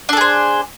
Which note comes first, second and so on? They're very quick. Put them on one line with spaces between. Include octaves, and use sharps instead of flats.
D4 A4 G#4 C5